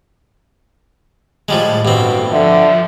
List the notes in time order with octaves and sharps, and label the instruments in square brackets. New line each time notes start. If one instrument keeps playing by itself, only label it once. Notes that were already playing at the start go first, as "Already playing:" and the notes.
[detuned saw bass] A2 [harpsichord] F3 G3 G#3
[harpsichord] G2 C4 [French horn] B2
[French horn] D3 [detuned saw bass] F3 [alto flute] E5